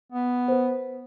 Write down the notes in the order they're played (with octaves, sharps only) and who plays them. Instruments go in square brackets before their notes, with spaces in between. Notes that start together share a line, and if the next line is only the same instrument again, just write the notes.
[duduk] B3
[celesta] B4 C5